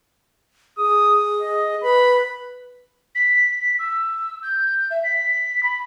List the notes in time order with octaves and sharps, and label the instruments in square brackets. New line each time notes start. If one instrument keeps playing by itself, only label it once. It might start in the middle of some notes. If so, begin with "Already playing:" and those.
[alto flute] G#4 [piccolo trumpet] D#6
[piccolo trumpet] D#5
[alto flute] B4 [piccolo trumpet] B5
[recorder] B6
E6
G6
E5
B6
B5